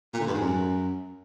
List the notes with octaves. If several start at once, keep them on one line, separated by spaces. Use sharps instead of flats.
A#2
D3
G2
G#2
F#2